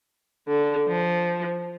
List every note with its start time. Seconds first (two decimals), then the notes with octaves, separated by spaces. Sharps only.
0.48 D3
0.88 F3